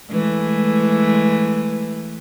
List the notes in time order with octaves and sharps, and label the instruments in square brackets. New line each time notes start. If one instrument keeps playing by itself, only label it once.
[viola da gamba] E3 G#3 A3